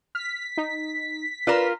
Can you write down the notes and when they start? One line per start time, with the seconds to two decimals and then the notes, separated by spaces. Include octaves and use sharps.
0.15 F6 B6
0.58 D#4
1.47 F4 A#4 B4 D5 E7